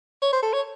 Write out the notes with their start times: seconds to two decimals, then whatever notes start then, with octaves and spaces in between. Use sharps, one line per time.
0.22 C#5
0.33 C5
0.42 A4
0.53 C#5